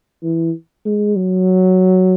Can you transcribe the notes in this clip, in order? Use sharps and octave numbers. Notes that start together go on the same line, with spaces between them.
E3
G#3
F#3